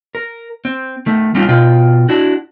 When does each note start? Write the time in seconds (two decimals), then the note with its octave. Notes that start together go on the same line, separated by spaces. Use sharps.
0.15 A#4
0.65 C4
1.06 D#3 A3
1.35 G3 C4 C#4 D#4 F4
1.48 B2 F4 G5
2.09 D4 E4 F#4